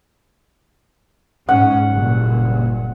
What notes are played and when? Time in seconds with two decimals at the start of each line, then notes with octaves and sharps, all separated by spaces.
1.49 G#2 C#4 F#5
1.90 F#1 G2 A#2